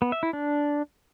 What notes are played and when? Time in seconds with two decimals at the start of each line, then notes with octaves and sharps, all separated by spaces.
0.02 B3
0.12 E5
0.23 E4
0.33 D4